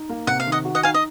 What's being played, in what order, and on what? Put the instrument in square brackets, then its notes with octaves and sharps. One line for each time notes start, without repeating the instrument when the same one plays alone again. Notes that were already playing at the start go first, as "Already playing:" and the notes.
Already playing: [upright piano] D#4
A#3
[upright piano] C3 [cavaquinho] F#5
[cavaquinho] F5
[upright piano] D#3
[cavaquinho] D#5 F#5
[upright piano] F#4
[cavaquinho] D#5 F#5
[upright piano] D#4 [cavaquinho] F5 G#5
[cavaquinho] D#5